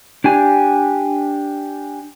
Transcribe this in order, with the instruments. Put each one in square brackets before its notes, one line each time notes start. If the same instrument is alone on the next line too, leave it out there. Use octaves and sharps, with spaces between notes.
[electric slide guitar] D4 G4 G#5